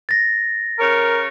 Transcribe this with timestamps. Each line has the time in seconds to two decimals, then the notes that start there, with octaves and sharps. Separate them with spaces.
0.09 A6 A#6
0.79 C#3 A#4 C#5